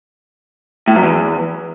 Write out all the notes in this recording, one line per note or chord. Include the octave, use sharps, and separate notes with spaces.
A2
F#2
E2